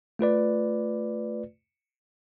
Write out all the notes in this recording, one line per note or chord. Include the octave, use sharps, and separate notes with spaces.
A3 F4 B4 D5